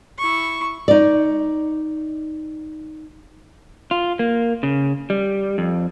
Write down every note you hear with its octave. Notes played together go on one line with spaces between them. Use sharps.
E4 C#6
D#4 D5
F4
A#3
C#3
G3
F2